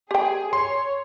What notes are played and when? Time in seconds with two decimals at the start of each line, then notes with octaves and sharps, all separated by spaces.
0.11 G4 G#4 G5
0.53 C#5 C6